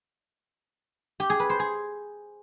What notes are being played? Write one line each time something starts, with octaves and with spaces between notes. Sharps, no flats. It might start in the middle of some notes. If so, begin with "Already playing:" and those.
G4
G#4
B4
C5
G#4